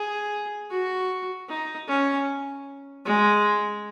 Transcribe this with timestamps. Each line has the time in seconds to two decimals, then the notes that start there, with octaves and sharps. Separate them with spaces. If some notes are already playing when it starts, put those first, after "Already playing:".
Already playing: G#4
0.70 F#4
1.49 D#4
1.88 C#4
3.05 G#3